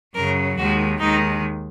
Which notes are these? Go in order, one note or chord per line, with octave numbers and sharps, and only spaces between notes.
F#2 C#3 F#3 A#4
D#2 D#3 G#3 F#4
D#2 D#3 G#3 D#4